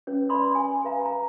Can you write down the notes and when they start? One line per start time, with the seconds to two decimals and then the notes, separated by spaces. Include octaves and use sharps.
0.07 C#4 B4 C#5
0.29 B4 D5 B5 C6 D#6
0.55 C#4 G#5
0.85 B4 F5 A#5
1.06 A#5